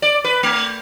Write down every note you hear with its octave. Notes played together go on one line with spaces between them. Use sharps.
D5
B4
A3